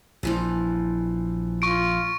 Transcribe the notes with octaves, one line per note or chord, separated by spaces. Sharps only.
A#1 A#2 E3 F3
F4 C#6 D7